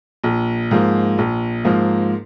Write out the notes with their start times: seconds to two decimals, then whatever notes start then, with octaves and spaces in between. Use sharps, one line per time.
0.24 A#1
0.71 G#2 F3 A#3
1.18 A#1
1.65 G#2 F3 A#3